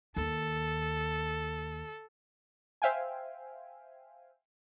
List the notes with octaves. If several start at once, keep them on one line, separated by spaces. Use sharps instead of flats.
D#2 A4
C5 E5 F5 G5 G#5